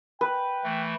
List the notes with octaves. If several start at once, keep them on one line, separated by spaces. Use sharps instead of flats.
B4 G5
E3 A3